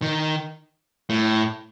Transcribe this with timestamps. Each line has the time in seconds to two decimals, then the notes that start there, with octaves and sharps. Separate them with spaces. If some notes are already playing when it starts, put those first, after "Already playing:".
0.02 D#3
1.09 A2